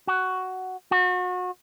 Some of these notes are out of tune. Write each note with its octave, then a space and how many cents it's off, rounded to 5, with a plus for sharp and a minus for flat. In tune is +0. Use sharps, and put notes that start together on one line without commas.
F#4 +10
F#4 -30